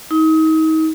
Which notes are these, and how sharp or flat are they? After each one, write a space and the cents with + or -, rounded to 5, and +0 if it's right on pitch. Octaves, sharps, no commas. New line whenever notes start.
D#4 +35